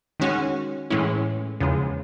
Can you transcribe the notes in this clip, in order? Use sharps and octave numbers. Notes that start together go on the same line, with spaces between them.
D#3 G#3 C#4 F#4
A2 E3 G#3 C#4 E4
E2 C#3 F3 G#3